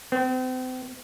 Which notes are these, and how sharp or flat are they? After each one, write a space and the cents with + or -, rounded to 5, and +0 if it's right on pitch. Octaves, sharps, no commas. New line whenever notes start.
C4 -40